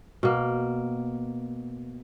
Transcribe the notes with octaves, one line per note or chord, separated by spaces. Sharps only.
B2 A#3